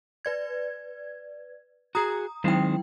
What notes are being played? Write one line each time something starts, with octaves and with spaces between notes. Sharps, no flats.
B4 D5 G#6
F#4 G#4 A#5 D#6
D#3 F#3 G#3 C4 E4 G5